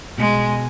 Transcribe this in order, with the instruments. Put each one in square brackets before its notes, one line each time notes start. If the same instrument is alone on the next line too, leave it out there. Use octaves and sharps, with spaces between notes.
[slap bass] B2 [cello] G#3